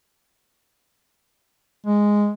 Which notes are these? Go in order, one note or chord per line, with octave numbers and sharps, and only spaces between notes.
G#3